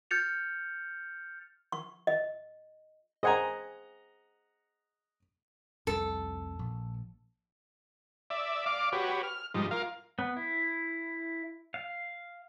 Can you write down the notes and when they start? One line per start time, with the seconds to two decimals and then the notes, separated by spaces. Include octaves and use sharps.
0.11 F6 G6 A6 C#7 F7
1.72 C#6
2.07 D#5
3.23 G#4 C5 D#5 F#5 G#5 A#5
5.87 F1 C2 A4
6.59 A#1
8.30 D5 E5
8.66 D5 F5 D6
8.92 F#4 G4 B4 C#5
9.23 F6
9.54 G#2 F3 G3 D#4
9.71 F4 A#4 F5
10.19 B3
10.37 E4
11.74 F5